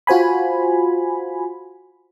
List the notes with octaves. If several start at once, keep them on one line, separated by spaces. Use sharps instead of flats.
F4 F#4 C5 G#5 B5